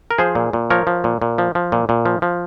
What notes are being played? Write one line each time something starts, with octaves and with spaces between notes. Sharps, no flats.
A#4
F3 G#4 C5
A#2
A#2
F3 A#4 C#5
F3
A#2
A#2
F3
F3
A#2
A#2
F3
F3